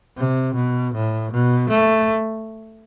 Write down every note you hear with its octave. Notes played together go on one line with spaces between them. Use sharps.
C3
B2
A2
B2
A3